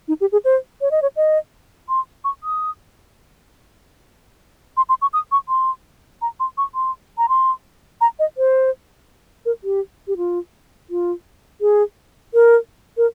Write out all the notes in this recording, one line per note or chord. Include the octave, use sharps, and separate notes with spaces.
D#4
G4
G#4
C5
C#5
D#5
C#5
D#5
C6
C#6
D#6
C6
C6
C#6
D#6
C#6
C6
A#5
C6
C#6
C6
A#5
C6
A#5
D#5
C5
A#4
G4
G4
F4
F4
G#4
A#4
A#4